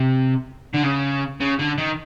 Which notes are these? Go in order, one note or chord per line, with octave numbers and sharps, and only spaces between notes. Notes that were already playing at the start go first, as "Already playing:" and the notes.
Already playing: C3
D3
C#3
C#3
D3
D#3